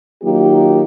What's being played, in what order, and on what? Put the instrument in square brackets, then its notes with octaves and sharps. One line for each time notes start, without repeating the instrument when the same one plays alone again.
[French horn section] D#3 F#3 A#3 D#4 F4 G4